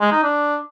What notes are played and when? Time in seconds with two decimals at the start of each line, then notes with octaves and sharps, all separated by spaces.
0.01 G#3
0.12 D#4
0.23 D4